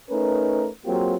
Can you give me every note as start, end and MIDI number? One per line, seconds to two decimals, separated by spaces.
0.10 0.67 57
0.10 0.67 61
0.10 0.67 63
0.10 0.67 70
0.10 0.67 71
0.85 1.14 54
0.85 1.14 58
0.85 1.14 60
0.85 1.14 65
0.85 1.14 67
0.85 1.14 68